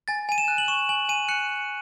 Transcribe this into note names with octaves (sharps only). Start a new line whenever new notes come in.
G#5 A6
G#5 D#7
E7
F#6
F#7
C#6 E7
G#5 F#7
G#5 D#7
F#6 C#7